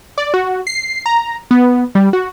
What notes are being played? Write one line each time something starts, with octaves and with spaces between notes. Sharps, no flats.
D5
F#4
C7
A#5
B3
G3
F#4